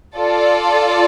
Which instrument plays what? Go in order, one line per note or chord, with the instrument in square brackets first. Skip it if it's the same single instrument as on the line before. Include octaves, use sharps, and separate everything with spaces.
[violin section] F4 A4 D5